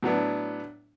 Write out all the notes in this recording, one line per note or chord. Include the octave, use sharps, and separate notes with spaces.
A2 F#3 B3 D4